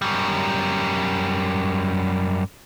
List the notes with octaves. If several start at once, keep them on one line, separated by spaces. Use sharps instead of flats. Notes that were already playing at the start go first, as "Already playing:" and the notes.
F#2 G3